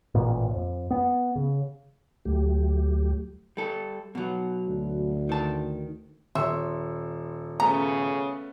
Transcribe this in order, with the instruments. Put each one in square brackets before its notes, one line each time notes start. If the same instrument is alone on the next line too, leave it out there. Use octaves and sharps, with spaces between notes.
[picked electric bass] A1 A#2 A#3
D#1 F2
B3
C#3
[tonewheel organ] D2 F#3 A3 G4
[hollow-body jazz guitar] G3 A4
B2 F#3
[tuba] D2
[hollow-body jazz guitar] D#3 A5
[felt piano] D#1 [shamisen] E5 [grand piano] C6 C#6 E6
[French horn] C#3 [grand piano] A3 B3 C#4 [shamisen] A#5